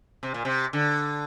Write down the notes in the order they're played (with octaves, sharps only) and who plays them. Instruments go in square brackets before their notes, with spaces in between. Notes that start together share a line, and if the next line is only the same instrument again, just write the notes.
[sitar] C3
A#2
C3
D3